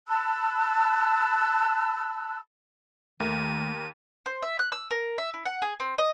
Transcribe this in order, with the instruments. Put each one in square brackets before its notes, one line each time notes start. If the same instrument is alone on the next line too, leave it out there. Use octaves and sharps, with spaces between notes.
[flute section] A5 B5 E6 F#6
[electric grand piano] D#2 A#4 [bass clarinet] D#3 [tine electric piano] A3 [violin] D#7
[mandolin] C5
E5
F#6
E6
A#4
E5
E4
F#5
G#4
C4
D#5